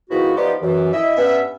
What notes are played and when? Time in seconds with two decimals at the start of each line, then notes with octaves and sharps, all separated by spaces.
0.10 G#2 D#3 F3 B3 E4 F#4
0.36 F3 B3 D4 D#4 F4 G4
0.62 F#2 E3
0.93 E4 D#5 E5
1.17 G2 B3 C#4 E5